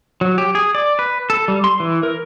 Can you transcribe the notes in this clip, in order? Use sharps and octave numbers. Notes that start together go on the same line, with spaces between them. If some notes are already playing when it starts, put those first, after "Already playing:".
F#3
G4
G#4
D5
B4
A4
G3
C6
E3
A#4